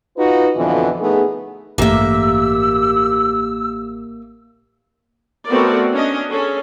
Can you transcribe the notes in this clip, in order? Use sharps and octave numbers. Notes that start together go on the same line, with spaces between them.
D#4 F4 F#4 B4
F2 B2 D3 E3 F3
A3 B3 D#4 G#4
A1 G2 A3 A#3 G4 E5 E6
A3 B3 C4 F#4 A#4 D5
C#4 D4 D#5
C#4 G#4 A4